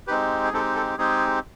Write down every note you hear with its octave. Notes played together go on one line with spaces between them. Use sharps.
G#3 C4 D#4 G4 B4
G#4
G#3 C4 D#4 G4 A4
A4
G#3 C4 D#4 G4 G#4